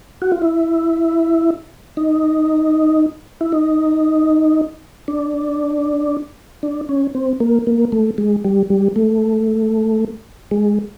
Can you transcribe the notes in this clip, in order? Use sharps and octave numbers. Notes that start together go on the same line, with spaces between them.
F#4
F4
E4
D#4
E4
D#4
D4
D4
C#4
C4
A#3
A#3
A3
G#3
G3
G3
A3
G#3